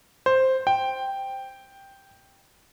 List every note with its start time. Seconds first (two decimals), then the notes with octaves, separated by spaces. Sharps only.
0.26 C5
0.67 G5